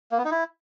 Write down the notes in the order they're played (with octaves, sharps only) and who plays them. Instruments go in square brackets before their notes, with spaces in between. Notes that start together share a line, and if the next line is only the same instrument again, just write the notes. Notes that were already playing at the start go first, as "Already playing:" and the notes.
[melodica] A#3
B3
D#4
E4